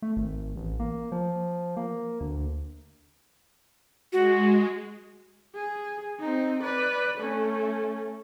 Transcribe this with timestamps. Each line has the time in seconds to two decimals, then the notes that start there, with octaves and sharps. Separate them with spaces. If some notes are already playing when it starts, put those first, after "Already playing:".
0.02 A3
0.17 G#1
0.56 A1
0.80 A#3
1.12 F3
1.77 A#3
2.21 D2
4.13 G#3 F#4
5.54 G#4
6.20 C4 D#4
6.63 B4 D5
7.18 A3 C#4